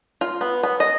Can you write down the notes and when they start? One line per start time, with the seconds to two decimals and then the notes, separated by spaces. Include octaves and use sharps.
0.21 F4
0.41 B3
0.63 B3
0.80 D#5